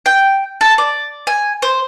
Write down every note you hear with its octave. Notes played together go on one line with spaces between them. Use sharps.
G5
A4
D5
G#5
C5